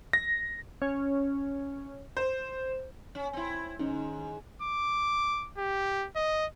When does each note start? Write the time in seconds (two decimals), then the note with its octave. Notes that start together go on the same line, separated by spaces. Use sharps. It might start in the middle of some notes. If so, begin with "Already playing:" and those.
0.13 A#6
0.82 C#4
2.17 C5
3.15 C#4
3.33 C4 E4
3.79 G#2 D#3 C#4 D#4
4.62 D6
5.58 G4
6.15 D#5